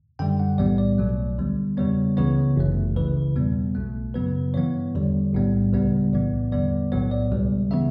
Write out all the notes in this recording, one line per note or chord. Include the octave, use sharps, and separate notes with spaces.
F#2 D3 G3 G5
F#5
B1 A2 E3 G3 B3 D5
D5
B1 B2 F#3 A3
D2 D3 G3 B3
E2 C#3 G3 B3 C#5
C#2 C#3 E3 B3 C#5
G1 F#2 E3 A3
C#2 C#3 E3 B4
E2 B2 G3 B3
B1 B2 A3
F#2 C#3 F#3 B3 B4
G2 E3 B3 C#5
E2 D3 G3
B1 A2 G3 B3
C#2 C#3 G3 B3
B1 A2 E3 B3 D5
E2 D3 G3 B3 D5
B1 A2 F#3 B3 C#5
D5
C#2 B2 G3
C#3 E3 B3 E5